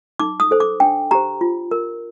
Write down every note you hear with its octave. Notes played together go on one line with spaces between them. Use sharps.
D#4 D6
D#6
A4 C5
D6
D4 G5
G4 C5 A#5
F4
A#4